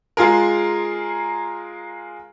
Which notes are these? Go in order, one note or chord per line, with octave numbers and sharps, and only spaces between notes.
G#3 F4 G#4 A#4